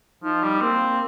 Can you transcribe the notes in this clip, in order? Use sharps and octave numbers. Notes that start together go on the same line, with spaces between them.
F3 D#4
G3
A#3 C4